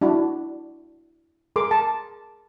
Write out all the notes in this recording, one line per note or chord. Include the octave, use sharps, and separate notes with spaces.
D4 E4 F#4
G#4 A#4 C6 D6
A5